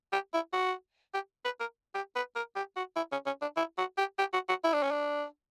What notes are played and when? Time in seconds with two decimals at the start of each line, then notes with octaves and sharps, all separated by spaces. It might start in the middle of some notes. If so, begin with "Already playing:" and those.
0.12 G4
0.33 E4
0.53 F#4
1.14 G4
1.45 B4
1.60 A#4
1.95 G4
2.16 B4
2.36 A#4
2.56 G4
2.76 F#4
2.96 E4
3.12 C#4
3.26 C#4
3.41 D4
3.57 E4
3.78 F#4
3.98 G4
4.19 G4
4.33 F#4
4.49 F#4
4.64 E4
4.73 D4
4.83 C#4
4.91 D4